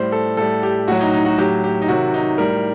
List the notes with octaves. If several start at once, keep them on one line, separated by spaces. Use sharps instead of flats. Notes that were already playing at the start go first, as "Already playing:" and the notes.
Already playing: A2 G3 C5
A4
A2 G3 A4
G4
A2 F#3 F#4
D#4
D#4
F#4
A2 F#3 G4
G4
D#4
C3 D#3 F#3 F#4
D#4
A2 G3 A#4